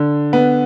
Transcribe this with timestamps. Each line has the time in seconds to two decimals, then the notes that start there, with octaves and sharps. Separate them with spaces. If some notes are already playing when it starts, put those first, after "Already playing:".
Already playing: D3
0.33 B3